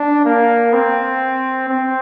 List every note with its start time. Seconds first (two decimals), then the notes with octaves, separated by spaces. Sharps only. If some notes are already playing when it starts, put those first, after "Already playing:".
Already playing: D4
0.25 A#3
0.73 C4
1.69 C4